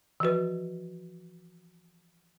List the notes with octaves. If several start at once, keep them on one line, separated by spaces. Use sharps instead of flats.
E3 F3 F#4 B4